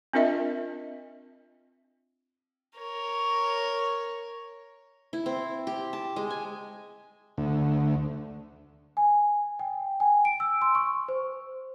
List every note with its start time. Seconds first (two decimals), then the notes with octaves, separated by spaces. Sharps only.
0.13 C4 D4 F4 A#4 D#5 E5
2.78 A#4 C#5
5.13 E4
5.26 C4
5.67 G4
5.93 A5
6.16 G#3
6.30 G#5
7.38 D2
8.97 G#5
9.59 G5
10.00 G#5
10.25 D7
10.40 E6
10.62 C6
10.75 C#6
11.08 C5